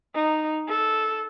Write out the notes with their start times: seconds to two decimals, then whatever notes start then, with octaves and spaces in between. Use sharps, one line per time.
0.15 D#4
0.68 A4